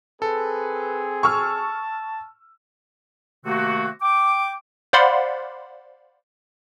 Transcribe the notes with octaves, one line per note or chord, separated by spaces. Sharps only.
C4 G#4 A4 B4
A5 C#6 E6 F6
C3 D#3 A3 A#3 C4 F#4
G5 D6
C5 D5 F5 F#5 B5 C6